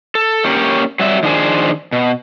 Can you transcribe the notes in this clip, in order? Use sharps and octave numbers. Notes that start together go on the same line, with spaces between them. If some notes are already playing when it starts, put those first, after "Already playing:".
A4
A#3 C#4 G4 C#5
F#3 G3 E5
D#3 F3 D4 G#4 C5
B2